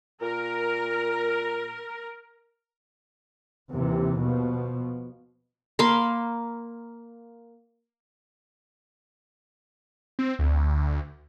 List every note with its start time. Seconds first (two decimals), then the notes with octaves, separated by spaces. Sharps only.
0.22 A#2 A#4
3.71 D#2 C3 E3
4.22 B2 F3
5.79 A#3 F5 B5 C6
10.19 C4
10.39 D2